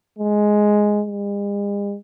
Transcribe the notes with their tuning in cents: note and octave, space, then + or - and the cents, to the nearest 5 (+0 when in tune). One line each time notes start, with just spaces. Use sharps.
G#3 +5
G#3 -45